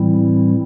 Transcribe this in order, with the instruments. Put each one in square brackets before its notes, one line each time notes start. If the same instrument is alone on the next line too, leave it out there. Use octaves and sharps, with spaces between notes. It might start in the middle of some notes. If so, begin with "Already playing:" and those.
Already playing: [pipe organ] A2 E3 G3 C4 E4